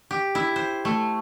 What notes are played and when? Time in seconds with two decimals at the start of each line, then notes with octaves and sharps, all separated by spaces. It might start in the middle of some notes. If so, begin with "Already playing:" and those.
0.11 G4
0.35 E4
0.56 C5
0.85 A3